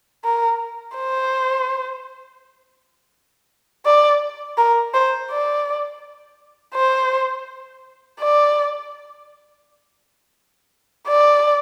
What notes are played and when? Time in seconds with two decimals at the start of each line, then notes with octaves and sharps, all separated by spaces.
0.24 A#4
0.96 C5
3.86 D5
4.58 A#4
4.94 C5
5.31 D5
6.74 C5
8.19 D5
11.08 D5